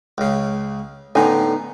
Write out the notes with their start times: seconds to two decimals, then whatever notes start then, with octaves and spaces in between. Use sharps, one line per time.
0.18 C#2 C#3
1.15 A2 D3 B3 D#4 G#5